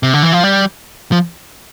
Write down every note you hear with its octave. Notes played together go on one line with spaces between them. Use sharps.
C3
D3
E3
F3
G3
F3